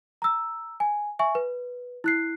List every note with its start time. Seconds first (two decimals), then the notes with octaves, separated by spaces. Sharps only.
0.22 A#5 E6
0.80 G#5
1.19 E5 G#5 C#6
1.35 B4
2.04 E4 F#6 C7